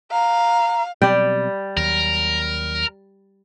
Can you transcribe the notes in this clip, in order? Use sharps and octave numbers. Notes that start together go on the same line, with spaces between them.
F5 A#5
B2 F#3 G3 C4 D5 G5
D#2 F#3 A#4